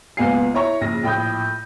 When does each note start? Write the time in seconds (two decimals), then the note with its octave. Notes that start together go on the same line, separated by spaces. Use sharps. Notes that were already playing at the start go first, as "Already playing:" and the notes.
0.17 C#2 A#2 B3 F5 G#5 C7
0.54 E4 C#5 A#5 C#6
0.81 A#1 C#3 A#6
1.03 A#1 A2 G5 B5 D#6 G6